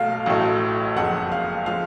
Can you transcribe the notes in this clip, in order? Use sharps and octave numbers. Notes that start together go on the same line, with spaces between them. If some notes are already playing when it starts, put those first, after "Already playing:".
Already playing: B1 B2 F#3 A3 F5
A1 A2 F#3 A3
F#1 F2 F3 G#3 F#5
F5
F3 G#3 F5